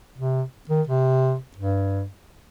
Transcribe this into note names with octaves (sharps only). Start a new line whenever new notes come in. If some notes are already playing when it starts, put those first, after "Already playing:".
C3
D#3
C3
G2